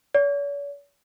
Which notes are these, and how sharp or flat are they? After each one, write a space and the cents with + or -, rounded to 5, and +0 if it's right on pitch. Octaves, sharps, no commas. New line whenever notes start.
C#5 +45